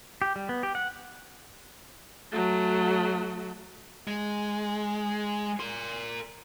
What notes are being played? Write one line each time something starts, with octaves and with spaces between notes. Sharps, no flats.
G4
G3
B3
G4
F#5
F#3 A3
G#3
A#4 C6